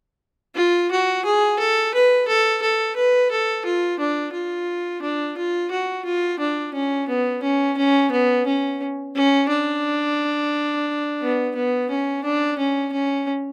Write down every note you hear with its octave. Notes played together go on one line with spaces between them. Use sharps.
F4
F#4
G#4
A4
B4
A4
A4
B4
A4
F4
D4
F4
D4
F4
F#4
F4
D4
C#4
B3
C#4
C#4
B3
C#4
C#4
D4
B3
B3
C#4
D4
C#4
C#4